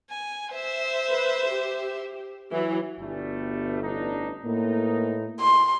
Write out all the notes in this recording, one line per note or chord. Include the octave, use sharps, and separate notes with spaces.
G#5
C5 E5
B4
G4
E3 F#3
G1 B2 G3 A3
A1 D4 D#4
A2 A#3 B3 D#4
C6